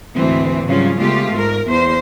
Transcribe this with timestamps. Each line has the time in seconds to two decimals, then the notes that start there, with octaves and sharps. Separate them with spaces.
0.15 D2 G#2 E3 C4
0.64 G#2 C#3 F#3 G3 C#4 F4
0.98 C#3 G#3 A3 B3 F4 G4
1.32 G#2 A#4
1.67 E2 C5